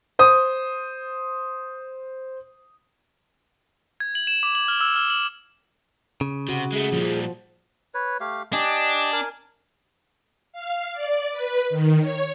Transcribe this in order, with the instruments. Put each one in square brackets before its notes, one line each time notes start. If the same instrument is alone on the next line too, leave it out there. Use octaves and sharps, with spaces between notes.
[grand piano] C5 D#6
[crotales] G#6
F#7
E7
D6
F#7
F6
E6
F6
F#7
[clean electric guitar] C#3
[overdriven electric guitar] C3 [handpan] F#4
[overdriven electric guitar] G#3 A3 [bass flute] G#4
[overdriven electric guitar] A#2 G3 [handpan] F3
[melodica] B4 C#5
A3 G4 F5
[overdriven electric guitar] D4 [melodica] G4 D#5 G#5
[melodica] A#4 G#5
[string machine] F5
D5
B4
D#3
C#5